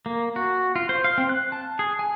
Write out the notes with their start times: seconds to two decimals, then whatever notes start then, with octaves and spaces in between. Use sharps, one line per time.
0.06 A#3
0.36 F#4
0.76 F4
0.89 C5
1.04 F5
1.18 C4
1.29 F#6
1.52 A5
1.79 G#4
1.99 G#5